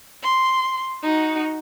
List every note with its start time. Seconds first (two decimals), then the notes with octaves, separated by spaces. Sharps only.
0.23 C6
1.03 D#4 F#4